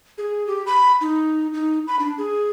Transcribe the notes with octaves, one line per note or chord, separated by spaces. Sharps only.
G#4
G4
B5
D#4
D#4
B5
D4
G#4